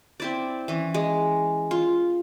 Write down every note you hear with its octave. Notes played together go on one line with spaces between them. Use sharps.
C4 E4 D5
E3 C#4
G#3
F4